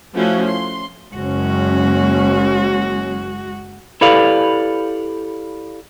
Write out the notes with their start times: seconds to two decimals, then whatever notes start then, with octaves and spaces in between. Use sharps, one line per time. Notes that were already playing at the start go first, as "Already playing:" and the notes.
0.14 F3 A3 C#4 E4 F#4
0.49 C6
1.15 F#1 G#3 C#4 F#4
4.01 E4 G4 A4 B4 D5 F5